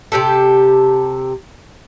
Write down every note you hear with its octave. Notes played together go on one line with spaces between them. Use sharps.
C3 E3 G4 A4